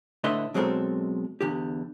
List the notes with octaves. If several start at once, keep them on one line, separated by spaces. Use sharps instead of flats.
A2 D3 B4 D#5 E5 C6
B2 F#3 G#3 C4 A4 A#4
E2 D3 G4